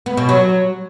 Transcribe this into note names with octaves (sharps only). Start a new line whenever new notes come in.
B3
B2
F#3